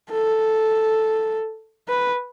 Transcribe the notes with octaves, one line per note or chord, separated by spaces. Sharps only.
A4
B4